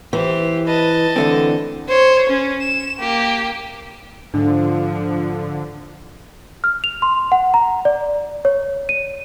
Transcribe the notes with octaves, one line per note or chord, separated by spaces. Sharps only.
E3 G4 C5
B4 D#5 A5
D3 E3 A3 C4
C5 C#5
C#4
E7
A#3 G4
G#2 D3 F3 D4
F6
F7
C6
F#5
A#5
D5
C#5
D#7